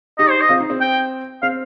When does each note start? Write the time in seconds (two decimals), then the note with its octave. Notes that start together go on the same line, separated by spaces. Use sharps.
0.18 D#4 G4 D#5
0.30 C5
0.41 D#5
0.49 C4 F4
0.60 D#4
0.70 C4
0.81 G5
1.42 C4 F5